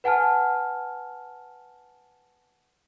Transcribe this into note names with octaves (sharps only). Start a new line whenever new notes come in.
B4 F#5 G#5 A5 F6